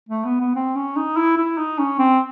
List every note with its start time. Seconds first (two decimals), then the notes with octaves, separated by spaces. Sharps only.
0.09 A3
0.25 B3
0.41 B3
0.56 C4
0.76 C#4
0.96 D#4
1.17 E4
1.38 E4
1.58 D#4
1.79 C#4
1.99 C4